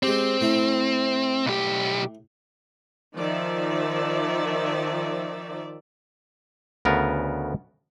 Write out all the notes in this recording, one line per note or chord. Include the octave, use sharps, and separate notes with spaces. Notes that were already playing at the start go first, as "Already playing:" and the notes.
G#3 C4 G4
A2 A3 E4
B1 G4
D#3 F3 D5 E5
D2 C#3 B3 A#4